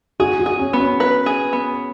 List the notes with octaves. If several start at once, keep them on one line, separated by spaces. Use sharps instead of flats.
F#4 G#4
F#4
G#4
C#4
B3
C#4
B4
G#4
B3